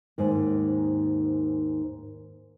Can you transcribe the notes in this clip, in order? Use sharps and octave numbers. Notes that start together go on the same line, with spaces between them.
D#2 G#2